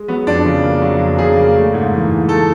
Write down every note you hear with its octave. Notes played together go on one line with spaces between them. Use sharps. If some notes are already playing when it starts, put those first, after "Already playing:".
Already playing: G#3
F#3 B3
F2 D4
C#3
A#3
F#3
F2
C#3 G#4
A#3
A3
G#2
E3
G#2
A3 A4